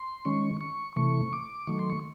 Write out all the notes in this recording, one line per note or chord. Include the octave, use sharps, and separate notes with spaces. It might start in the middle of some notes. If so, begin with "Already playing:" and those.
Already playing: C6
D#3 G#3 C#4 C#6
C#6
C3 E3 A3 C#6
D6
D#3 F#3 A3 C#6
C6
C#6